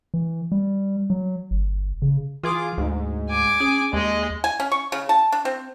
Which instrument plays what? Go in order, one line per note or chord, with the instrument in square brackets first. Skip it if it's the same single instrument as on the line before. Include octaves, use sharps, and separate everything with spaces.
[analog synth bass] E3
G3
F#3
G1
C#3
[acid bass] E3 [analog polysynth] F4 G#4 D6
[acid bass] D2 [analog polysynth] G#2
[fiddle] G#5 D6
[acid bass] C#4 [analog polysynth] G#4
[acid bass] D#2 [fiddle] G#3 D#5
[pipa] G#5
C#4
C#6
C#3
A5
D4
C4